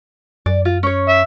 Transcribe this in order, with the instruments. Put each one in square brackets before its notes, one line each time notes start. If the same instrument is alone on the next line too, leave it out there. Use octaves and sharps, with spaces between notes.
[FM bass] F#2 [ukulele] D5
[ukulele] F4
C#4 C#5
[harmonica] E5